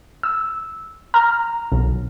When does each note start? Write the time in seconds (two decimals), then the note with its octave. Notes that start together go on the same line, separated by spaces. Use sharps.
0.23 E6
1.14 A#5 F6
1.72 B1